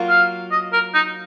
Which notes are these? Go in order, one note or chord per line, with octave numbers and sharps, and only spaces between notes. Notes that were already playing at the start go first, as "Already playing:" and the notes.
Already playing: F#3 A#3 F4
F5
D#5
A#4
D#4